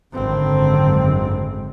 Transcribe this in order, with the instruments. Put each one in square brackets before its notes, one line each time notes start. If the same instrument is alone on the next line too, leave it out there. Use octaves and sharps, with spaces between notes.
[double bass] G#1 C4 [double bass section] F#2 D3 G#3